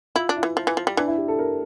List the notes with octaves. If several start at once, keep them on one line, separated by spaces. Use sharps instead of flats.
E4 F4
D4
E4
E3
F3
E3
F3
G3
E3 D4
E4
G4
A4
A#4